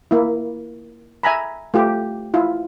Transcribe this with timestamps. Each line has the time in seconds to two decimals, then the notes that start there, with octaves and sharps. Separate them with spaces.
0.11 A#3 E4
1.23 E5 G#5 A#5 B5
1.74 A3 F4 G4
2.34 E4 F4